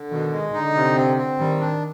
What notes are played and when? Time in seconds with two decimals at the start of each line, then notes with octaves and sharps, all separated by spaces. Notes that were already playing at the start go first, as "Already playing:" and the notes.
Already playing: D3
0.11 B2 D#3
0.32 G#3
0.53 D3 D#4
0.75 C3
0.96 C4
1.17 C4
1.39 D#3 G3
1.60 D4